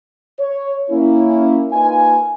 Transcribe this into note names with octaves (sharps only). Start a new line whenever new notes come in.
C#5
A#3 C#4 E4
A#3 D#4 F4 B4 G#5